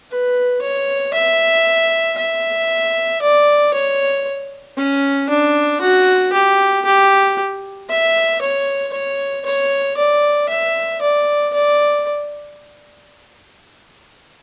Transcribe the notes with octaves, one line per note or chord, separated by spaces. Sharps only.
B4
C#5
E5
E5
D5
C#5
C#4
D4
F#4
G4
G4
E5
C#5
C#5
C#5
D5
E5
D5
D5